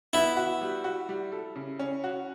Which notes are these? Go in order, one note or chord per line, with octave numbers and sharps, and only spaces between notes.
B3 E4
F#4
G3
F#4
G3
A4
C#3
C#4
F#4